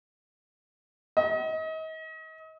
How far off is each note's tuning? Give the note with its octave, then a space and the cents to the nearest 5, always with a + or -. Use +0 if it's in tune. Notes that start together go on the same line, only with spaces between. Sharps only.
D#5 +35